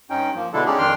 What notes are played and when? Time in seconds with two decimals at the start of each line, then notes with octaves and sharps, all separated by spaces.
0.10 G2 C#4 D#4 G5
0.35 F3 A#3
0.53 B2 D3 G#3 D4 E4 A4
0.66 G#3 C#4 D#4 G4 G#4 D5
0.78 F2 D#3 D4 G5 C6 F6